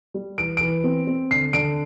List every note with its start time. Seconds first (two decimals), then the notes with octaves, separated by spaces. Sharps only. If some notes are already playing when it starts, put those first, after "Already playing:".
0.14 G3
0.38 E3 D7
0.57 E3 D7
0.84 C4
1.07 C4
1.31 D3 C7
1.53 D3 D7